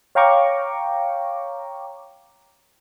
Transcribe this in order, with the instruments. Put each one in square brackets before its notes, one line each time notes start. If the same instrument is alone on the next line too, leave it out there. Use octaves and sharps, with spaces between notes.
[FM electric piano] C#5 F5 G5 A#5 C#6 D6